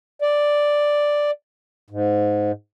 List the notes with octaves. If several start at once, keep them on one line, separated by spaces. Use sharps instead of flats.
D5
G#2